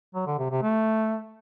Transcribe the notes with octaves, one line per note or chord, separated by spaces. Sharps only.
F#3
D3
C3
C3
A3